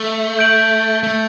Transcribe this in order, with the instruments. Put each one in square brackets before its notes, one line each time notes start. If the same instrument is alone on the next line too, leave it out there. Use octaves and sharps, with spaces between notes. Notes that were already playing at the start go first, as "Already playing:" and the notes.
Already playing: [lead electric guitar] A3 [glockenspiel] E6
[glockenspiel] G6 D7 F#7
[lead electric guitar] A3